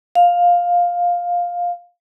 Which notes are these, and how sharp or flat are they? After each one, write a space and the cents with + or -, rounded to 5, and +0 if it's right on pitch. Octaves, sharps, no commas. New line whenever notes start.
F5 +10